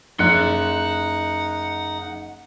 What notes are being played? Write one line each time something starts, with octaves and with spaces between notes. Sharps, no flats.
F#1 D#4 F#5 C6 F#6 C#7